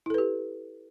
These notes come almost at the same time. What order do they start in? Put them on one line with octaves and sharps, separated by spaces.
E4 A4 B4 G4